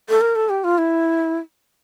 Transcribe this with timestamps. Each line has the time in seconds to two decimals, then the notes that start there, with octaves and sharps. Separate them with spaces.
0.09 A4
0.21 A#4
0.35 A4
0.49 G4
0.64 F4
0.78 E4